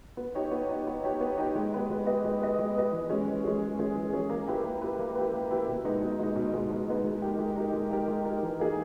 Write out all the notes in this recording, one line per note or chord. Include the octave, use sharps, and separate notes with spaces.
B3
D#4 G4 C#5
B3
D#4 G4 C#5
B3
D#4 G4 C#5
B3
D#4 G4 C#5
G#3
B3 G4 B4 D#5
G#3
B3 G4 B4 D#5
G#3
B3 G4 B4 D#5
G#3
B3 G4 B4 D#5
E3
G#3 C#4 G#4
E3
G#3 C#4 G#4
E3
G#3 C#4 G#4
E3
G#3 C#4 G#4
A#3
E4 G4 B4
A#3
E4 G4 B4
A#3
E4 G4 B4
A#3
E4 G4 B4
B2
G#3 B3 D#4
B2
G#3 B3 D#4
B2
G#3 B3 D#4
B2
G#3 B3 D#4
G#3
D#4 G4 A#4
G#3
D#4 G4 A#4
G#3
D#4 G4 A#4
G#3
D#4 G4 A#4
E3
A#3 D#4 G#4